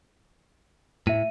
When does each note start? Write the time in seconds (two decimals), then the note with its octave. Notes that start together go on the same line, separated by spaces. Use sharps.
1.07 A2 E5 D#7